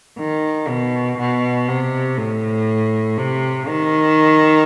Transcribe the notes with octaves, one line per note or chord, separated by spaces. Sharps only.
D#3
B2
B2
C3
A2
C3
D#3